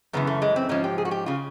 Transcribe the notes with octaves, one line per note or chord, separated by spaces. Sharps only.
F#2 C#3 E3 B3
A3
G#3
C4
G#2 F3 C#4
G4
G#4
F#4
G4
C#3 F4